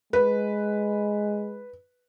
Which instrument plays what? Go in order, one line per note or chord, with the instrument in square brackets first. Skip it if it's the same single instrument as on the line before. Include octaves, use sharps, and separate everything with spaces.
[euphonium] G#3 [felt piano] B4